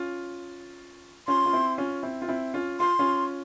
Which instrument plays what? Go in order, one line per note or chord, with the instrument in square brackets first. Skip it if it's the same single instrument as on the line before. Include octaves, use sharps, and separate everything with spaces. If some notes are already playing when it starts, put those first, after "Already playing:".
Already playing: [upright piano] C#4 F4
[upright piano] C#4 F4 [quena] C6
[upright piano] F4
C4 E4
C#4 F4
C4 E4
F4
C4 E4
C#4 F4
[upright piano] F4 [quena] C6
[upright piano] C#4 F4